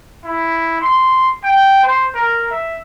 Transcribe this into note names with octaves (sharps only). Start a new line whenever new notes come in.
E4
C6
G5
C5
A#4
E5